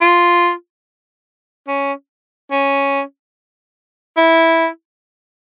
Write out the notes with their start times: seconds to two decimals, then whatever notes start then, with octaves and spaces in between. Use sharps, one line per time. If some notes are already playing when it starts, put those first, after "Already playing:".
0.02 F4
1.68 C#4
2.51 C#4
4.17 E4